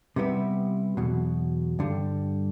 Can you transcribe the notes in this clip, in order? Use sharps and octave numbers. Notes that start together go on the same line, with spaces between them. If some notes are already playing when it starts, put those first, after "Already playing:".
C3 G3 B3 E4 B4
E2 B2 F#3
G2 D3 G3